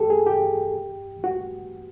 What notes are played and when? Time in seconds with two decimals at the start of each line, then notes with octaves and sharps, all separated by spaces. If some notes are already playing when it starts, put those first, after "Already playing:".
Already playing: G4 A4
0.10 G#4
0.26 G4
1.24 F#4